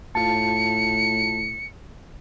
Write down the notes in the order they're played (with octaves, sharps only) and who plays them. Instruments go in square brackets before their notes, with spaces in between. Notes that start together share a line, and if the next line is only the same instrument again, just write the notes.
[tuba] A2 [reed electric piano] F4 A5 [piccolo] C#7